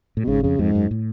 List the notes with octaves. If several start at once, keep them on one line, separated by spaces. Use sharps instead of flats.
A2
B2
G#1 G#2 C#3
F2 C#3
F2 G#2
F#2
A2